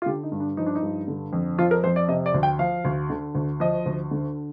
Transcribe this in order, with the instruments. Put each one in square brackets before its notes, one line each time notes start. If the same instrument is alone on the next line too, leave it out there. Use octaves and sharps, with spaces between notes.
[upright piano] F4
D3 G4
D#4
G2
D4
F3 D#4
D4
D#4
G2
D3
F2
F3 F4
A#4
F2 C5
D5
C3 D#5
D5
D2
G5
F3 F5
D2
D3
D2
F3 D#5
D2
D3